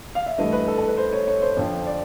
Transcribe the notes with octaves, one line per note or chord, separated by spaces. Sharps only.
F5
E5
G2 E3 A3 D#5
B4
A4
A4
B4
C5
C#5
C#5
C5
F2 D3 F3
D5